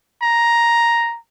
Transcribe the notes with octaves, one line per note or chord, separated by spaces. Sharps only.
A#5